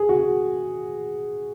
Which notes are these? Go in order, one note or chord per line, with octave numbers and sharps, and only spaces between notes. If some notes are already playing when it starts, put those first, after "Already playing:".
Already playing: G#4
F#4